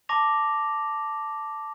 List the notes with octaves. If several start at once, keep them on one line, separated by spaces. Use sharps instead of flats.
A5 C#6 D6 A#6 F7